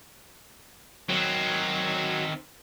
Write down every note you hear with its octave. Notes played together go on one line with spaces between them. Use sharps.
D#3 F#3 C4